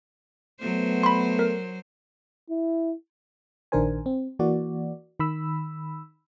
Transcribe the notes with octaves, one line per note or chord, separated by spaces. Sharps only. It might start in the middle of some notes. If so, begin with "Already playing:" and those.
F#3 A3 B3 C5
B5 C6
A#4
E4
A#1 D#3 D4 A#4 C5 G#5
C4
E3 A#3 F#4 D5
D#3 B5 E6